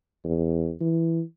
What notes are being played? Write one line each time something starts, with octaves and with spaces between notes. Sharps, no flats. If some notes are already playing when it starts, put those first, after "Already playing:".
E2
E3